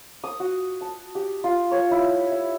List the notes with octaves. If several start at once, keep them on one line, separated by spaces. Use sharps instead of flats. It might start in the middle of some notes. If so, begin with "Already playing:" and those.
D#6
F#4
A5
G4
F4
C#5
E4
E5